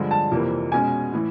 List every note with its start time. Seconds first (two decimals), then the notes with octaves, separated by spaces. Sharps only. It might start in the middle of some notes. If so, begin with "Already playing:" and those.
Already playing: G2 D3 F3 G#3
0.11 A5
0.31 F2 C3 E3 G3 A#3
0.72 B2 G#3 C#4 G#5
1.13 A2 E3